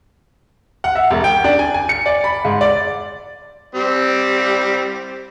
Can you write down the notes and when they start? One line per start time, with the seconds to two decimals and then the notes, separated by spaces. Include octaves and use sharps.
0.84 F#5
0.95 E5
1.11 E1
1.24 G5
1.44 D4
1.59 G#5
1.74 G#5
1.89 C#7
2.06 D5
2.24 B5
2.45 G#2
2.61 D5
3.75 G3 C4